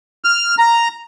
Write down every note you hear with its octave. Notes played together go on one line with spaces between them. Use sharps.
F6
A#5